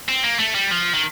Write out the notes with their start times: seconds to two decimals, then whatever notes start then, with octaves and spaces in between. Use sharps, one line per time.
0.08 C4
0.23 A#3
0.39 A3
0.55 G3
0.71 F3
0.94 D#3